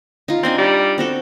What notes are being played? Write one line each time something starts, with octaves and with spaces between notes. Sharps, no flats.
D#4 F4
C4 D4 D#4 G#5
G3
C4 F#4 A4